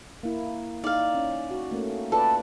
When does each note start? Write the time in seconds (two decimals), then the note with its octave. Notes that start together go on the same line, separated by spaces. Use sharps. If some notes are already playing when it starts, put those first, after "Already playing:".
0.23 A#3 E4
0.84 D#4 D5 F5
1.15 C#4
1.51 F#4
1.71 A3 A#3 C#4
2.12 F4 A4 B4 D5